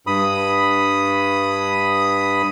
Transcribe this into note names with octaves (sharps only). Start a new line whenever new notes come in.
G2 B5 D#6